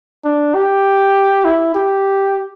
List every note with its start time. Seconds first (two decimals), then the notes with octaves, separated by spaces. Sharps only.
0.25 D4
0.55 G4
1.45 E4
1.75 G4